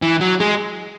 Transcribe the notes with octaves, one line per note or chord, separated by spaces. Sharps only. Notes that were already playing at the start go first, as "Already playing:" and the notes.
E3
F#3
G#3